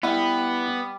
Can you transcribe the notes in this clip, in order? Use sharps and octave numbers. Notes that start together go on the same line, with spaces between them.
G3 B3 E4 G4 F#5